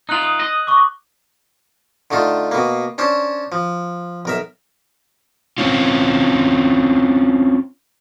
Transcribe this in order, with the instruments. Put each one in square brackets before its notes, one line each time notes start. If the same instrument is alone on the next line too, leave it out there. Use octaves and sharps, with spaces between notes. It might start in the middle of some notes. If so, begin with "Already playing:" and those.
[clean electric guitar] D#4 F4 [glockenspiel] D#6 F#6 F#7
[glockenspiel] D#6
[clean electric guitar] D#5
[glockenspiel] C#6 D6
[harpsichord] D3 A3 D#4 F4
B2 A#3
C#4 D4 C5
F3
B1 A#4 E5
[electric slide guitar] C4 C#4 F4